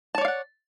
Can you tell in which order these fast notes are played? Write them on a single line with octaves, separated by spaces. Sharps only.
A5 C#5 D5 F5 F#5